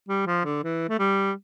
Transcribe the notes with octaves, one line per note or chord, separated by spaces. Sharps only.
G3
F3
D3
E3
A3
G3